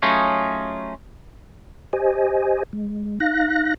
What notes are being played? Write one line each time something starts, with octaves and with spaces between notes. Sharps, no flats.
F#3 A3 C#4 D#4 F4 G#4
G4 C5 D#5 G#5
G#3
D#4 F5 F#6 A#6